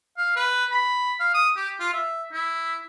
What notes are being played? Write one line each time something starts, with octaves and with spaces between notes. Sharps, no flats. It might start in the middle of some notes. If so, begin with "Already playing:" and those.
F5
B4
B5
F5
D#6
G4
F4
E5
E4